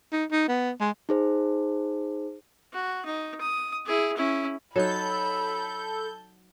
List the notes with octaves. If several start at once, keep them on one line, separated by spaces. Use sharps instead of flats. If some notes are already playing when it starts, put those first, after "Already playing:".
D#4
D#4
B3
G#3
D#4 G#4 C5
F#4
D#4
D#6
E4 G#4
C#4 E4
F#3 D#4 A4 B5 G6